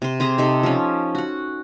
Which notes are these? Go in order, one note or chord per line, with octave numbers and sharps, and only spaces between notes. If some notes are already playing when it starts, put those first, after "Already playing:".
C3 C6
C4 G4 G#4 A#5
C3 D#4 A4
F3 C#4
F#4 F#5